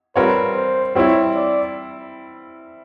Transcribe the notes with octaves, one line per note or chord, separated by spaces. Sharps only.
G3 C4 F4 A#4 B4 C#5
C5
G3 C4 E4 C#5
D5